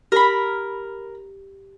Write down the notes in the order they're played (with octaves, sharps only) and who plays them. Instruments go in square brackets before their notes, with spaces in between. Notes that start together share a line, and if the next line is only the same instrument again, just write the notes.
[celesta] G4 [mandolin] A#4 B5